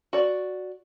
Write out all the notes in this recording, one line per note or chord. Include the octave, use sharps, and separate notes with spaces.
F#4 D5